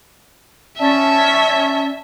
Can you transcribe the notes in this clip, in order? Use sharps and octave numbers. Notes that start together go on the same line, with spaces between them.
C#4 D5 E5 A5